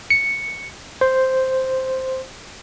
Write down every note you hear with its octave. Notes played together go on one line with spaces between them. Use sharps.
C#7
C5